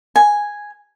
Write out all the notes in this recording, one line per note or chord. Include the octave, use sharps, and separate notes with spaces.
G#5